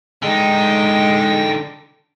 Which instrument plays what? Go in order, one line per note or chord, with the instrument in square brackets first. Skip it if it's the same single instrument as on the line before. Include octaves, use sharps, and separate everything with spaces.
[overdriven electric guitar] D3 D#4 [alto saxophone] G#3 [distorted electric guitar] G5